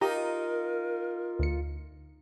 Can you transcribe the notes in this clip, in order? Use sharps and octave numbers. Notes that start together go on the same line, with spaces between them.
D#4 F4 G4 A#4 A#5
D2 C#7